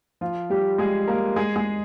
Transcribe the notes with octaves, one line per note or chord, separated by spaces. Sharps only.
F3 F4
G3 G4
G#3 G#4
A#3 A#4
G#3 G#4
G#3 G#4